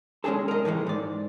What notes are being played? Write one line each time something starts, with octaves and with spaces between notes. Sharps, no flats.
G#3 C#4 D4 G#4 A4
A#4 D#5
A2 E3 G#3 A3
G#2 D5